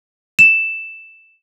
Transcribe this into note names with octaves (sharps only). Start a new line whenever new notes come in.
E7